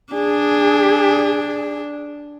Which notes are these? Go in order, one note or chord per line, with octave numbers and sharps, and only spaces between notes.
D4 G#4